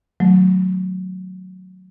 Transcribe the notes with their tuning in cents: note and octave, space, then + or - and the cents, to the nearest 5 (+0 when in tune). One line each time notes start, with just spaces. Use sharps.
D#3 +15 F#3 +0 A3 -5